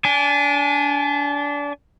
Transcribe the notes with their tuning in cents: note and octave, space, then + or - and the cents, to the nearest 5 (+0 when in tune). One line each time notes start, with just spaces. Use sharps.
D4 -25 G#5 +0